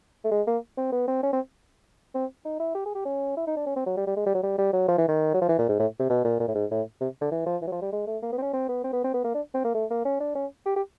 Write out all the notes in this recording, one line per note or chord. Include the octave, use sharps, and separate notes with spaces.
A3
G#3
A#3
C4
B3
C4
C#4
C4
C4
D#4
E4
G4
G#4
G4
C#4
E4
D#4
D4
C#4
C4
F#3
G3
G3
G#3
G3
F#3
G3
G3
F#3
F3
E3
D#3
F#3
F3
E3
A#2
G#2
A2
C3
B2
A#2
A#2
A2
G#2
A2
C3
D3
E3
F3
E3
F#3
F3
G3
G#3
A3
A#3
B3
C4
C#4
C4
B3
C4
B3
C4
B3
A#3
D4
C4
A#3
A3
A#3
C#4
D4
C#4
G4
G4